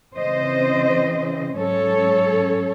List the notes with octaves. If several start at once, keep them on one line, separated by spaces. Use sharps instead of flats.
C#3 E3 C4 C5 D#5
G#2 F#3 C#4 A4 C#5